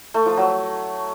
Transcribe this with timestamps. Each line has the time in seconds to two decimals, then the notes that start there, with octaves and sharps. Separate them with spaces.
0.14 A3
0.26 F3
0.37 F#3